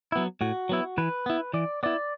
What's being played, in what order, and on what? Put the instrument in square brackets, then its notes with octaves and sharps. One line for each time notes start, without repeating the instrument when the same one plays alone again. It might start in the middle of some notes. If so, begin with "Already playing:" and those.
[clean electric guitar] F#3 B3 E4
A2 F#4
F#3 B3 E4
E3 B4
B3 E4
E3 D5
B3 E4 D5